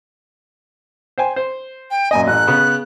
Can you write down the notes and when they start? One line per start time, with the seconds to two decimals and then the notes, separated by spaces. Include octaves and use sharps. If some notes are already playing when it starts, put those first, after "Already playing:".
1.18 C5 G5 G#5
1.36 C5
1.90 G5
2.11 F#2 A#2 D#5 G#5
2.27 A1 F#6
2.48 C#3 B3